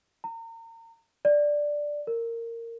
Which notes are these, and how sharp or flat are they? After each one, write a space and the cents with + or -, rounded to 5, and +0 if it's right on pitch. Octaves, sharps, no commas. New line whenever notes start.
A#5 -35
D5 +0
A#4 -15